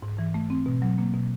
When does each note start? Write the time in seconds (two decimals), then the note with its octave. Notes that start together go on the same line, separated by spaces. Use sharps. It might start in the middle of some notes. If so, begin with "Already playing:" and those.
0.02 G#2
0.18 E3
0.34 A3
0.50 C4
0.66 B2
0.82 F#3
0.98 A#3
1.14 B2